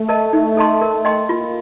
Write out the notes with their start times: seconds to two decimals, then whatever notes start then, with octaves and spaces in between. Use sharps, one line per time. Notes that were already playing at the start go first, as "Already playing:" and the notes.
Already playing: A3
0.09 A#4 D#5 A5
0.33 D#4
0.57 A4 D#5 A5 C6
0.81 A#4
1.05 D#5 G5 C6
1.28 A#3 F4